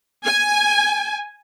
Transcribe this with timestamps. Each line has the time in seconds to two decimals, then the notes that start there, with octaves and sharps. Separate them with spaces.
0.24 G#5